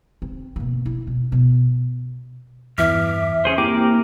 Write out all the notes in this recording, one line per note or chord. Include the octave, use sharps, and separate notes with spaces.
C4
B2 A#3
E4
B2
B2
E2 G2 E3 E5 D6 F6
C#4 G#4 C5
A#3 C4 E4 G4 A#4 G5 D6